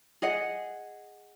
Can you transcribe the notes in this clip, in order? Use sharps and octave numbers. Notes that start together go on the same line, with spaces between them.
G#4 D#5 F#5